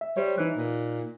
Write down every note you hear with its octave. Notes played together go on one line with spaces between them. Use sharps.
E5
G3 C5 C#5
E3 D#4 F#6
A#2